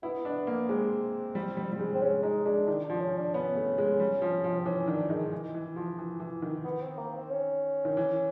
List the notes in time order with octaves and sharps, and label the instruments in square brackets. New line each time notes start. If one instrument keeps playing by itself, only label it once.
[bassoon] B3 [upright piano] E4
[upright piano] D4
A#3
[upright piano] G#3 [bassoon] C4
[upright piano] G3
G3
G3
G#3
[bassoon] C4
[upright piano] G#3 [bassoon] C#4
[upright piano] G#3 [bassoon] D#4
[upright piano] G#3 [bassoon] D4
[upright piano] D#3 [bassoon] D4
[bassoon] D4
[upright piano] F3
[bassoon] C#4
D4
[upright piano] B3 [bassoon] C#4
[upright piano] A3
G#3
G3
F3
F3
[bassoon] C4
[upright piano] E3 [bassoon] C#4
[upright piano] D#3 [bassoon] D4
[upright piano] D#3 [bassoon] G#3
[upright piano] E3
E3
F3
E3
E3
D#3
[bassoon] B3
C4
A#3
C4
C#4
[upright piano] D#3
E3